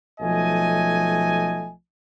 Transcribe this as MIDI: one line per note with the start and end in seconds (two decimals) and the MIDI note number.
0.20 1.71 35
0.20 1.71 53
0.20 1.71 57
0.20 1.71 75
0.20 1.71 80